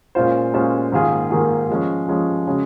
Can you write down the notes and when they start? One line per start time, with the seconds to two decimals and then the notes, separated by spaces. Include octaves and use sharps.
0.15 A#2 G#3 C#4 F4 C5
0.54 A#2 G#3 C#4 F4 C5
0.92 G#2 D#3 A#3 F4 G#4
1.31 G#2 D#3 A#3 F4 G#4
1.69 F3 G#3 C#4
2.08 F3 G#3 C#4
2.47 C#3 G#3 C#4 F#4